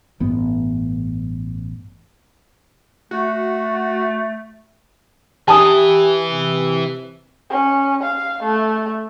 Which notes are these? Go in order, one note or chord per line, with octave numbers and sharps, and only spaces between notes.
A1 G2 B3
A3 F#4
E3 G4 G#5 A5 D#6
C3
C#4
F5
A3